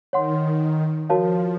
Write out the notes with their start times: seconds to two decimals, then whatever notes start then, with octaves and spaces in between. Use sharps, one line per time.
0.13 D#3 C#5 F#5 C6
1.09 F3 F#4 A#4 C#5 F5 A5